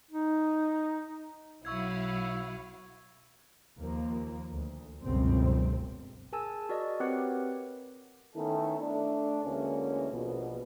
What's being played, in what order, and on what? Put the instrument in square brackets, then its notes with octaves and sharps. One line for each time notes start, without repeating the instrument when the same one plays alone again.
[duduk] D#4
[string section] B1 F#3 [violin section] E4 F5 F#5 [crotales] C#6 E6 G#6
[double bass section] D#2 F3 A#3
D2
G1 C#2 F#2 B2 C4
[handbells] G#4 A#4 G#5 A5 E6
F#4 A#4 D5 D#5
C4 G4 A#4 B4 C#5 F#5
[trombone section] D#3 A3 B3 C#4 E4 A4
A3 D4
D2 E3 G#3 A#3 C#4
A#1 B2